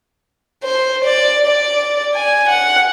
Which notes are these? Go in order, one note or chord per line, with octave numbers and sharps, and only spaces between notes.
C5
D5
D5
G#5
F#5